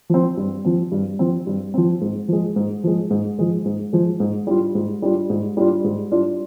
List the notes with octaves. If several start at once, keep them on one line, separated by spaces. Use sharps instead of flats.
F3 C4
G2
F3 C4
G2
F3 C4
G2
F3 C4
G#2
F3 G#3
G#2
F3 G#3
G#2
F3 G#3
G#2
F3 G#3
G#2
G3 D4 F4
G#2
G3 D4 F4
G#2
G3 D4 F4
G#2
G3 D4 F4